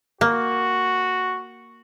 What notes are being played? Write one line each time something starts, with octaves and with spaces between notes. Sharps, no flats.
A#3 F#4